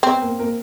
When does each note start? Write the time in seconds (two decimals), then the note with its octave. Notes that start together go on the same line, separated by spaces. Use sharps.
0.03 B3 C4 B4
0.22 A#3 A#4
0.39 A#3 A#4